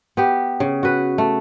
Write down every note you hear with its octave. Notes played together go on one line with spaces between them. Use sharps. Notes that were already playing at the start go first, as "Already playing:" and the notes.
B3 G4
C#3
F#4 B4
A3